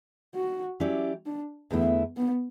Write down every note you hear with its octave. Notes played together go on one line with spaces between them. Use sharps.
F#4
F#3 C#4 E4 G4 D5
D4
E2 D3 A3 B3 E4
B3